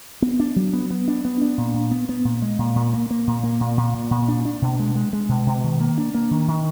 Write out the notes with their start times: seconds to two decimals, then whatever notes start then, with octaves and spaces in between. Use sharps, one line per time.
0.22 B3
0.40 D4
0.56 F#3
0.73 B3
0.91 B3
1.08 D4
1.25 B3
1.42 D4
1.58 A#2
1.74 A#2
1.91 B3
2.09 B3
2.25 A#2
2.42 G#3
2.59 A#2
2.76 A#2
2.93 A#3
3.10 A#3
3.27 A#2
3.43 A#3
3.61 A#2
3.77 A#2
3.94 A#2
4.11 A#2
4.28 D4
4.45 D4
4.62 B2
4.79 G#3
4.95 G#3
5.13 G#3
5.29 B2
5.46 B2
5.64 D#3
5.81 A#3
5.98 D4
6.15 A#3
6.31 D#3
6.48 D#3